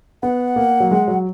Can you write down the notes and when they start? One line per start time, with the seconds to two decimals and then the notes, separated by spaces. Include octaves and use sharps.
0.22 B3 F#5
0.56 A#3
0.80 F#3
0.91 G#3
1.08 F#3